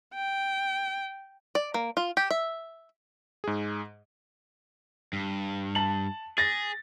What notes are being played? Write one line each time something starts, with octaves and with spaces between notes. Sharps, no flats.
G5
D5
A#3
F4
G4
E5
G#2 G#4
G2
A5 F#7
G#4 A6 A#6